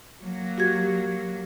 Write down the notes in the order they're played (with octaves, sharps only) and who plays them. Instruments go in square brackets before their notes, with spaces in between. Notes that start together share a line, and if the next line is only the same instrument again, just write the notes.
[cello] F#3 A#3
[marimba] F#4 G4 G#6